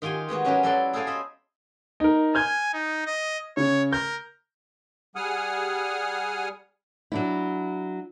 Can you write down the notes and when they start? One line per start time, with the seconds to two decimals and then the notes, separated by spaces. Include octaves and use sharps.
0.02 D#3 F4 G4 G#5 C6
0.29 G#3 B3 F#4 G#4
0.45 F#3 C#4 F#4 G4 A#4 B4
0.63 F#3 E4 A4 B4 D5 C6
0.93 G#4 A4 C5 D5 F5 G#5
1.07 D#5 E5 G#5 B5
2.00 D#4 A#4
2.35 G#5 F6 G6 G#6
2.73 D#4
3.06 D#5
3.57 C#3 C#5
3.93 A#4 G6
5.16 G3 G#4 F#5 G#5 D#6 F6
7.12 F#3 D4 E4